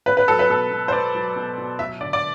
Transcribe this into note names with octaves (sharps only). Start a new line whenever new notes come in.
B3 B4
B4
F#3 A4
B4
B2 A4
B2
C5
B3 D5
F#3
B2
B2
F#3 E5
D3 D5
D5